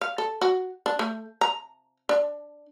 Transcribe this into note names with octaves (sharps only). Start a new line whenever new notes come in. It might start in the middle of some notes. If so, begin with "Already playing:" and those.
F5
A4
F#4
D4
A3
A#5
D4